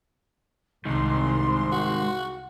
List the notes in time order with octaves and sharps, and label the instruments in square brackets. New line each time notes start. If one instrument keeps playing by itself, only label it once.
[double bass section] C2 [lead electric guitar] G#2 D#3 [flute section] C6
[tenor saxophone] F#4